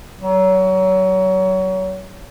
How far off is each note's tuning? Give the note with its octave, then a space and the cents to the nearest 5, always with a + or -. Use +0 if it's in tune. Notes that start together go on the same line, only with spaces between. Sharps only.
F#3 +25